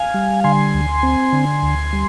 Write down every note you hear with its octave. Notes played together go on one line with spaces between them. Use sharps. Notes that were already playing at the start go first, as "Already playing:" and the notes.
Already playing: F5 G#5
G3
D3 G#5 C6
D2
C4
D3
D2
G3